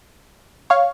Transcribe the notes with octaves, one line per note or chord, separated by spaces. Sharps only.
C#5 F5